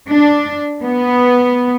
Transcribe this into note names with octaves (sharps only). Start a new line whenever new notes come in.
D4
B3